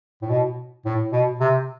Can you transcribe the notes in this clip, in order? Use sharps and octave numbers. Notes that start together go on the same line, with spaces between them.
A2
B2
A2
B2
C3